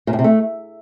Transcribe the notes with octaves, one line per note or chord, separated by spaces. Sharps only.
A#2
A2
C3
A3